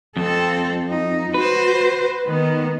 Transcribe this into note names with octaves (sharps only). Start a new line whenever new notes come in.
F2 C4 A4
D#4
F#4 B4 C5
D#3 B3